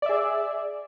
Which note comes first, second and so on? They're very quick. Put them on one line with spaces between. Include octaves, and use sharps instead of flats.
D5 E5 G#4